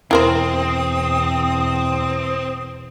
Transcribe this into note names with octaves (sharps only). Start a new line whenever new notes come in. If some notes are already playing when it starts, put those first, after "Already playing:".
E2 B2 C4 E4 A#4 C5 D#6